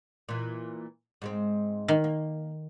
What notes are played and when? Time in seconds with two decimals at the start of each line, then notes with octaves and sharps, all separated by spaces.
0.29 A#2 E3
1.22 G#2 G#3 C4
1.88 D#3
2.04 A#3